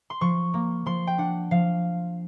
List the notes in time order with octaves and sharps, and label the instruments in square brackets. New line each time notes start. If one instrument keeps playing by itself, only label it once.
[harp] C6
F3 C#6
A#3
F3 C6
G5
D4 F#5
F3 F5